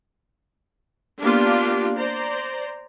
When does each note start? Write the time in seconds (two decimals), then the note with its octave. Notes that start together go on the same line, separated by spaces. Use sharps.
1.21 A#3 B3 D4 F4 G4
1.95 C5 D5 A#5